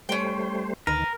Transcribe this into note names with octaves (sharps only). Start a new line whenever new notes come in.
G3 A3 C#4 C5 G5
D2 D#3 A#4 B4